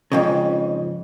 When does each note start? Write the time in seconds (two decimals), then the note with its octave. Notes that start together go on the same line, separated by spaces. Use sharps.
0.12 F2 G#2 C#3